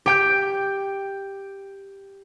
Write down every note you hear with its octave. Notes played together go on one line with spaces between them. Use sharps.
G4 G5 G6